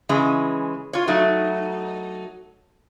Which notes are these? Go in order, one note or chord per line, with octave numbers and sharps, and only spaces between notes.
C#3 E3 G#3 C#4
F4 C#5
F#3 A3 D#4